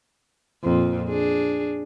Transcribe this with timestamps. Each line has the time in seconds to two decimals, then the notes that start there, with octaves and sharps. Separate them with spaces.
0.64 F2 A#2
1.09 D4 G#4